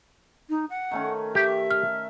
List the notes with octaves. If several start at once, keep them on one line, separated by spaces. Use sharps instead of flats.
D#4
F#5
D#3 A3 C#4
G4 E5
F6